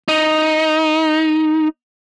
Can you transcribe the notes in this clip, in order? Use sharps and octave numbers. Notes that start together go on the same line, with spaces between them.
D#4